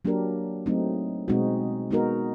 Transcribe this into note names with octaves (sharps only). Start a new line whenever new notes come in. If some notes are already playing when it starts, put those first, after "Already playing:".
F#3 A#3 D4 G4 A#4
F#3 A3 C4 D#4
B2 G#3 C4 D#4 F#4
G#3 B3 D#4 F#4 A#4